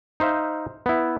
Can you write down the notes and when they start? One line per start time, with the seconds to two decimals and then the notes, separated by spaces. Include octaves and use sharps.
0.20 D#4 C5 E5 F5
0.86 B3 E4